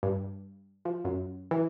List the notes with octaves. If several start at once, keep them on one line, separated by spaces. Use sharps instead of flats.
G2
F3
F#2
E3